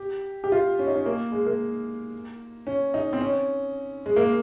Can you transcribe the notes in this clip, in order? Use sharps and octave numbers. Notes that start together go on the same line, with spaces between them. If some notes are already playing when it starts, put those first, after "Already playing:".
Already playing: G4
G4
F4
C#4
D#4
C#4
A#3
G#3
A#3
C#4
D#4
C4
C#4
G#3
A#3